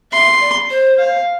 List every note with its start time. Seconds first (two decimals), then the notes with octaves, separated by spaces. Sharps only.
0.12 E5 C6
0.40 D5
0.70 C5
0.98 F5